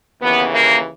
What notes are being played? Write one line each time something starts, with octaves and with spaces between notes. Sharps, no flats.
D#2 C#3 E3 B3
A#3